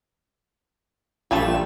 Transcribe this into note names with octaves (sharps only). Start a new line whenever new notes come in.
A#1 G3 A3 F4 A5 E7